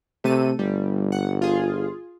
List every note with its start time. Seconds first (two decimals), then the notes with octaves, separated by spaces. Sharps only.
0.24 C3 A3 A4 D#7
0.59 G1 G3
1.12 F#5
1.42 F4 G#4